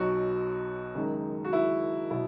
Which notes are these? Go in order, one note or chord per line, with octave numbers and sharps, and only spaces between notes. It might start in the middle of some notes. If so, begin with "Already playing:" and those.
Already playing: B1 B2 F#3 F#4
F#1 F#2 D#3 G#3
F#4
E4
B2 F#3 E4